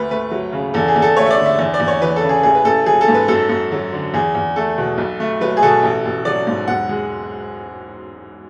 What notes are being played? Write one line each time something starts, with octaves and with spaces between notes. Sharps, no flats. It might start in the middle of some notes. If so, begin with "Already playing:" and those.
Already playing: D2 B4
A3 B4
F#3
C#3
E2 A4
G#4
E2
A4
A3 C#5
E5
D5
D3
E5
E2
D5
E2
C#5
E3 B4
A4
C#3
G#4
A1 G#4
B4
A1 A4
F#3 G#4
A4
G#2
B4
F#2 A4
F#2
F#3
D3
E2 G#4
E2
A3 A4
B2
B1
A3
F#3 B4
G#4
B2 A4
A1
A1
F#3 D5
G#2
E1 F#5
G#3